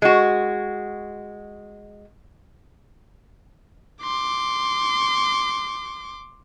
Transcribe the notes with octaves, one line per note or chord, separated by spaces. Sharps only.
G#3 F#4
C6 D6